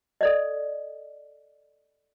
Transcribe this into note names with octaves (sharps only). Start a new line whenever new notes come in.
A4 D5 D#5